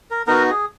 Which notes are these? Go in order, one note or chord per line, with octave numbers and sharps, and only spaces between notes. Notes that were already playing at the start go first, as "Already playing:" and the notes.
A#4
B3 D#4 F#4 A#4
G#4